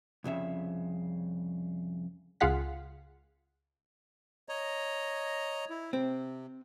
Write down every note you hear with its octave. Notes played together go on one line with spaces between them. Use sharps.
C2 F2 C#3 E5
C#2 F4 G#4 F5 F#5 B6
C#5 D#5 A#5
E4
C3 C4